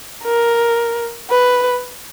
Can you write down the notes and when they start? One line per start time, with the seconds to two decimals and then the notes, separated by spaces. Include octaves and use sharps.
0.24 A#4
1.30 B4